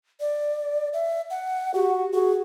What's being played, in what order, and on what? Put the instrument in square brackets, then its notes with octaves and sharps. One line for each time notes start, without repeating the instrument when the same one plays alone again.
[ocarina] D5
E5
F#5
[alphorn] F#4 [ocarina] G4
[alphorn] F#4 [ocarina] G#4